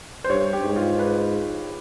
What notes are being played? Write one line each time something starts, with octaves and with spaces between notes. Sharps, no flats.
C5
G2 C#5
G4
G#2
F4
B4